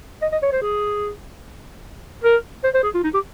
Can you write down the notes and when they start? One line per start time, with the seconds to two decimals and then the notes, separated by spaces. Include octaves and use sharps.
0.22 D#5
0.32 D#5
0.43 C#5
0.52 C5
0.62 G#4
2.24 A#4
2.64 C5
2.74 C5
2.83 G#4
2.94 F4
3.04 D#4
3.14 G4